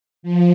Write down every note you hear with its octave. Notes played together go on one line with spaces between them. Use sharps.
F3